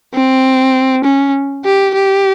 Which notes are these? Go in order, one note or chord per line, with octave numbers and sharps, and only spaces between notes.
C4
C#4
G4
G4